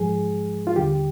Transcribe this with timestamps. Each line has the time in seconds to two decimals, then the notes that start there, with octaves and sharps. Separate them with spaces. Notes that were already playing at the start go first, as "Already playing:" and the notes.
Already playing: G#2 F3 G#3 G#4
0.67 F4
0.76 D#2 D3 G3 G4